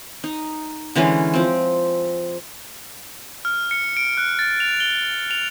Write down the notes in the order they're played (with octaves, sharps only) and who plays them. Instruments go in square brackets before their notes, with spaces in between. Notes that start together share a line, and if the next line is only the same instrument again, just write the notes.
[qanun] D#4
D3 E3 G#3 C#4
F3 C4
[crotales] F6
C#7
D7
F#6
A6
F7
G7
F7